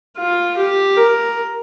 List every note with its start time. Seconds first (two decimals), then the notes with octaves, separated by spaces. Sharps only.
0.18 F4
0.57 G4
0.97 A#4